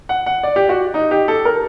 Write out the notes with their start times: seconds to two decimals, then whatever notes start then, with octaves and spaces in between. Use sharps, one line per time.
0.09 F#5
0.26 F#5
0.43 D5
0.56 G4
0.69 F#4
0.94 D#4
1.11 G4
1.28 A4
1.45 A#4